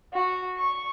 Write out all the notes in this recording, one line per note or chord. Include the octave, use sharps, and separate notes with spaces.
F#4
C#6